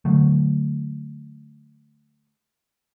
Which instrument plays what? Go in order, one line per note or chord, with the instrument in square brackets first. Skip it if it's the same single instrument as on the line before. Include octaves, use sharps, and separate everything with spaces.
[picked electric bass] D3 F#3 A3